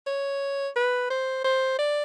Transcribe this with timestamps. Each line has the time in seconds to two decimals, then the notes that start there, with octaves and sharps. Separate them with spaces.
0.07 C#5
0.76 B4
1.10 C5
1.45 C5
1.79 D5